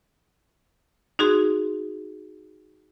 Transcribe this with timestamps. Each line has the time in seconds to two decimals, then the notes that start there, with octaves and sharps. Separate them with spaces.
1.19 D#4 F#4 G#4 C6